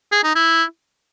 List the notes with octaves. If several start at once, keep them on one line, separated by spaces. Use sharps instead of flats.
G#4
D#4
E4